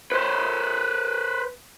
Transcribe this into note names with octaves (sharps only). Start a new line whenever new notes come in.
B4 C5